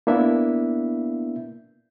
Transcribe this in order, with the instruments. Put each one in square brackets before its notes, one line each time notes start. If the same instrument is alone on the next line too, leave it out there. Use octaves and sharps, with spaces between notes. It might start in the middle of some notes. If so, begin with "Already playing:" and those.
[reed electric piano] A#3 B3 D4 E4 E5